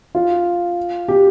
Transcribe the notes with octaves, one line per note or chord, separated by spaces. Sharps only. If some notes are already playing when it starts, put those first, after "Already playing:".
F4
G4